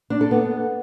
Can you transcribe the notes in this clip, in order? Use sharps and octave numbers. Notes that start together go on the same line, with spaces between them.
D4
A4
B3